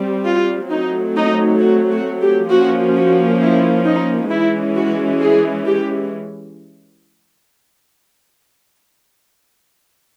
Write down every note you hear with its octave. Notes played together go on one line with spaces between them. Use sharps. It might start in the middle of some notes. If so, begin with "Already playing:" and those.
Already playing: G3 C4
F4
F#3 A3 C4 D#4
D#4
F#4
F#4
G4
F3 A#3 C#4 F#4
F#4
E4
D#4
E3 G#3 C#4 E4
F#4
G#4
G4